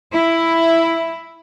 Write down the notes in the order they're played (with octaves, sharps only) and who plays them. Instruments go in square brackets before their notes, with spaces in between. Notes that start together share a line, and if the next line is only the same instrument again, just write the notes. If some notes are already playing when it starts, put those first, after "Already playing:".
[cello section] E4